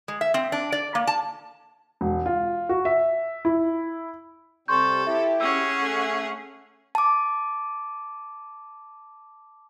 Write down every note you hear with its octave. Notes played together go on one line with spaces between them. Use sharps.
G#3
E5
C4
D4
D5
A#3
A5
E1
F4
F#4
E5
E4
C3 G3 C4 A4 C6 C#6 G6
E4 G4 E5
C#4 G#4 F#5 E6
A3
A5 D6